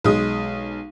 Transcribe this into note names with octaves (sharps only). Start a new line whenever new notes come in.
B1 G#3 D#6